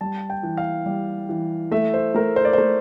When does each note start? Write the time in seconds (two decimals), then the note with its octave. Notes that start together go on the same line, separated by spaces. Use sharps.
0.01 G3 A5
0.30 G5
0.43 E3
0.57 F5
0.86 G3
1.29 E3
1.72 A3 E5
1.94 C5
2.14 A3 A#4
2.36 C5
2.45 D5
2.53 A3 C5